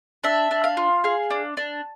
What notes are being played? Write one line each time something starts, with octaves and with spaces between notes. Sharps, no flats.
D4 E5
D4
F5
F4
G#4 F5
D4
D4